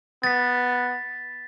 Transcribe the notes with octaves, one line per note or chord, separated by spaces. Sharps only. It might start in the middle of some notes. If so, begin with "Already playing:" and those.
B3 A6 B6